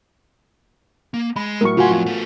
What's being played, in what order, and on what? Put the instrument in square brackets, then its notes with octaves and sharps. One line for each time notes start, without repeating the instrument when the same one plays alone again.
[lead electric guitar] A#3
[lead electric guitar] G#3 D#5 [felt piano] B5
[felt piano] A2 F#3 [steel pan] A#4 C#6
[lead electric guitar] C#3 C6 [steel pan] F4 F#4 G#5
[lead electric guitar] F2 [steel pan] F4
[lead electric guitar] A3 B3